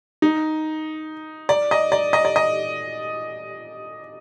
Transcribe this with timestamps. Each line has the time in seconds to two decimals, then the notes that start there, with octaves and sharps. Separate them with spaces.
0.22 D#4
1.49 D5
1.71 D#5
1.92 D5
2.13 D#5
2.25 D5
2.36 D#5